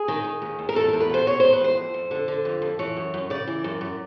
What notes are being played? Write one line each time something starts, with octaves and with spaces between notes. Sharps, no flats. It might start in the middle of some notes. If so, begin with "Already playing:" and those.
Already playing: G#4
D#3
D#3
D#2
D#2
A#4
E2 A4
E2 A#4
B4
B2 C5
B2 C#5
E2 C5
B4
E2 C5
F2
F2
D3
D3
F2
F2
E3 C#5
F#2
F#2
C#3 D5
E3
F#2
F#2